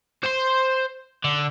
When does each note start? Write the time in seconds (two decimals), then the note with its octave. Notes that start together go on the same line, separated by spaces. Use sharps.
0.23 C5 C6
1.24 D3